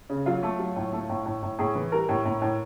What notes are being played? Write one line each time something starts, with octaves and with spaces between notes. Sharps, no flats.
C#3
F#3 F4
A3
F#3
A2
A3
A2
A2
A2
A2 G#4
E3
G3 A#4
A2
A2
A2